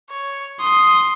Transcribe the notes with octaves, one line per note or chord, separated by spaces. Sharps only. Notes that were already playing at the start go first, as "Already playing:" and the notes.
C#5
C6 D#6